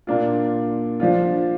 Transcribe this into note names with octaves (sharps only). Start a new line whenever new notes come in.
A#2 A#3 D4 F4
F3 D4 F4